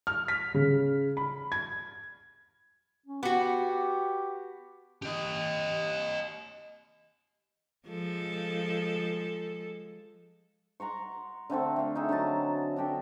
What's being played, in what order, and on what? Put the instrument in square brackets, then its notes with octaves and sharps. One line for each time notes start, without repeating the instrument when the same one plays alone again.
[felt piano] F6
B6
C#3
B5
G#6
[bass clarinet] C#4
[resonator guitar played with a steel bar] B3 F#4 [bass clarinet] G4
[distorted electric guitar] G4 D#5
[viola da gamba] F3 G#3 A4
[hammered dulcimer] F#5 A#5 C6 C#6
D3 A3 C4 A4
A3 F5
D#4 G#4 E5
D3 F#3 D#5 A5
D4 F#4 G4 A4